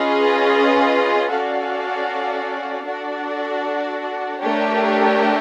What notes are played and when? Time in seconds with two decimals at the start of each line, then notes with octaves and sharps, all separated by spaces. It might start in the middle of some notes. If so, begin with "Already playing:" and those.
Already playing: C#4 F4 G#4 B4 D#5
1.29 C#4 F#4 A4 D5 F5
2.83 D4 F#4 A4 D5
4.38 A3 D4 G4 A#4 C#5